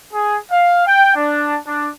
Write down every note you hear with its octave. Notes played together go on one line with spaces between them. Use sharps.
G#4
F5
G5
D4
D4